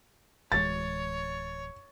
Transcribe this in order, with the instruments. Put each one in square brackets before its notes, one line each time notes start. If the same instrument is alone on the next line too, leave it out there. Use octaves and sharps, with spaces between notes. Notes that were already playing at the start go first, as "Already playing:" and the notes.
[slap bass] D1 E3 G#3 [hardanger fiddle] C#5 [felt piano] A6